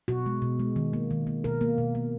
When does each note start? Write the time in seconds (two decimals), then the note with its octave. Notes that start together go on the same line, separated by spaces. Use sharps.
0.08 B2 F#4
0.26 G#3
0.42 B2
0.59 G#3
0.76 D#3
0.93 A#3
1.11 D#3
1.27 A#3
1.44 B2 A#4
1.61 A#3
1.78 B2
1.95 A#3